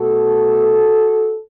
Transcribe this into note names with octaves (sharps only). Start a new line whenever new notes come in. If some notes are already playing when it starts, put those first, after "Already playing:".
Already playing: B2 A3 F#4 A4